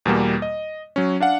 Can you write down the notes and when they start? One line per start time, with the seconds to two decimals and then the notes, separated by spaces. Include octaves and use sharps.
0.05 E2 B2 G3 A#3
0.42 D#5
0.96 F#3 C#4
1.20 D4 F5 F#5